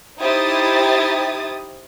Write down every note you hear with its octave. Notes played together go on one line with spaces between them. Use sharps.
D#4 E4 G4 C5 D#6 A6